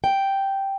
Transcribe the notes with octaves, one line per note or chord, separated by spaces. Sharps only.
G5